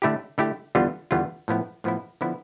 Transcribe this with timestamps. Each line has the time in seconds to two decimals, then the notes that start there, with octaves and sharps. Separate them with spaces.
0.02 D3 A3 E4 G4
0.38 D3 A3 E4 G4
0.75 E2 D3 G3 B3 F4
1.11 E2 D3 G3 B3 F4
1.48 A2 F3 B3 E4
1.84 A2 F3 B3 E4
2.21 D3 F3 B3 E4